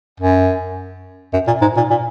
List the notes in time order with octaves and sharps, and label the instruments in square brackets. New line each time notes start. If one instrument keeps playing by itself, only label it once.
[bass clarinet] F#2
F#2
A#2
G#2
A#2
A#2